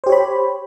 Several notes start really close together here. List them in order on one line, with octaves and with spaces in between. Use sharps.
C5 G4 C#5 B5